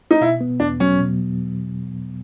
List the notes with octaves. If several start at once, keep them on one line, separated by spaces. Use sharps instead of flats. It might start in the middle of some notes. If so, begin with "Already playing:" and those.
D#4
B2 E4
B3
E2 D4
F#3 C#4
B2